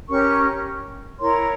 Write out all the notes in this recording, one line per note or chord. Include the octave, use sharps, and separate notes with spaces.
C#4 G4 A#4 C#6
E4 A#4 C#5 C6